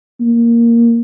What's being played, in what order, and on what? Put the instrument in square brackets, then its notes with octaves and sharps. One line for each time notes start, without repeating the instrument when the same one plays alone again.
[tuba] A#3